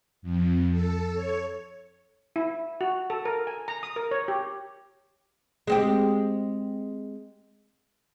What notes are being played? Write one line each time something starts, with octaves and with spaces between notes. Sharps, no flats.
F2
A4
C#5
E4
F#4
A4
A#4
G#5
A#5
D#6
A#4
C#5
G4
G#3 C4 G4